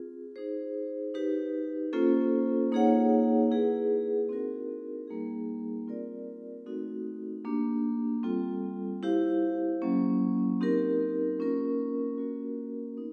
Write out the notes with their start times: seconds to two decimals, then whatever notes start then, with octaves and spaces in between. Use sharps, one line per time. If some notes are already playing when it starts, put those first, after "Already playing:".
Already playing: C4 F4 G#4
0.36 D#4 G#4 C5
1.14 D#4 G4 B4
1.93 A#3 C#4 F4 A4 C5
2.72 A#3 D#4 G#4 C#5 F#5
3.51 E4 G#4 B4
4.29 C4 D#4 F#4 A#4
5.08 G3 A#3 D#4 G#4
5.87 C4 F4 A#4 D5
6.66 A3 C4 D#4 F#4 A4
7.45 A#3 D4 G4
8.23 G3 C4 F4 A4
9.03 E4 G4 C5 F5
9.82 F#3 A#3 C#4
10.61 C4 D#4 G4 A#4
11.39 A#3 C#4 F4 A#4
12.18 A#3 C#4 F#4 A#4
12.97 B3 D#4